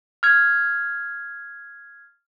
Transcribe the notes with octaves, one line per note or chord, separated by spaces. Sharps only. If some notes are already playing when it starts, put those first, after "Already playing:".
F6 G#6